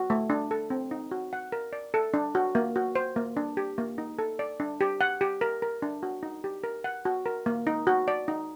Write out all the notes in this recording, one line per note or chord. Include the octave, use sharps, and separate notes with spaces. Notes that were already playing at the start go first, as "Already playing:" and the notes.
Already playing: F#4
A3
D4
A4
C4
D#4
F#4
F#5
A#4
D5
A4
D4
F#4
A#3
F#4
C5
A#3
D4
G4
A#3
D#4
A4
D5
D4
G4
F#5
G4
A#4
A#4
D4
F#4
D#4
G4
A#4
F#5
F#4
A#4
A#3
D#4
F#4
D5
D#4